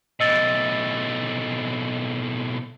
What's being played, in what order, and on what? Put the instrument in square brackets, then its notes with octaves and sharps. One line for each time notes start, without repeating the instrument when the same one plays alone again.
[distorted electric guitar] B1 A2 [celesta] D#5 E6 A6